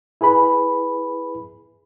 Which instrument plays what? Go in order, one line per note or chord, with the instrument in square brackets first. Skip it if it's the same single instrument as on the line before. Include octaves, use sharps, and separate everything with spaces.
[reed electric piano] E4 G#4 B4 B5